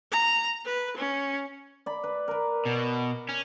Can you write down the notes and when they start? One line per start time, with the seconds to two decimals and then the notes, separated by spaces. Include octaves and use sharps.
0.12 A#5
0.65 B4
0.97 C#4
1.86 D5 B5
2.04 B4
2.28 A#4 B4
2.66 B2
3.29 C#4